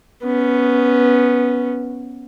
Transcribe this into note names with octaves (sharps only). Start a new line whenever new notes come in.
B3 C#4